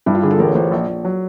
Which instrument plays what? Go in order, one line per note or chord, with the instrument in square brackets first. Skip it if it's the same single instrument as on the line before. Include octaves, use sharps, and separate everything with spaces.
[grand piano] G2 [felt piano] E4
[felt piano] F4
[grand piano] D3 [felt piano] G#4
[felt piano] A4
[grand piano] A1 [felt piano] A#4
[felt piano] C#5
[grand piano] A1 [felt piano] C5
[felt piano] C#5
[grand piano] A#1 [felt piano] D5
[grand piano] A#1
F#3